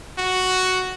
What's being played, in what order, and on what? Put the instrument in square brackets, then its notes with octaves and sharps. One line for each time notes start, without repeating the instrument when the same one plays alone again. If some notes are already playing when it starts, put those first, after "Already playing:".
[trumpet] F#4